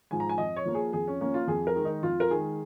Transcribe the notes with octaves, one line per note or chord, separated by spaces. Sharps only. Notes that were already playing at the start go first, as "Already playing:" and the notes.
G#2 F3 G#5
A#5
G#5
F2 D#5
C#5
F3 A#3
G#4
F2 G#4
C#4
F3 A#3 C#4
F4
F2 G#4
A#4
D#3 G#3
D#4
F2 F4
A#4
D#3 G#3 G#4